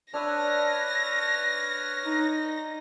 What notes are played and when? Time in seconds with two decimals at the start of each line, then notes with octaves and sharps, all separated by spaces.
0.13 D4 B4 C#5 E5 B5 F6 A#6
2.06 D#4